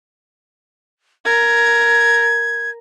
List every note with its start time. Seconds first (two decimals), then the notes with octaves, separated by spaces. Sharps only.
1.26 A#4 G#6